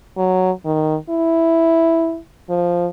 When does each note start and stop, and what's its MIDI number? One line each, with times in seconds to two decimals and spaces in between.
0.17 0.52 54
0.65 0.96 51
1.10 2.19 64
2.50 2.87 53